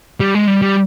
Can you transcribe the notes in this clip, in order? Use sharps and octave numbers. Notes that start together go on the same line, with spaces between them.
G3
G#3
G3
G3